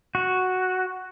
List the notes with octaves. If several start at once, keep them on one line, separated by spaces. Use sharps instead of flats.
F#4